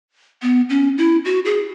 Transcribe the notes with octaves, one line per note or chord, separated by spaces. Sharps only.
B3
C#4
E4
F#4
G#4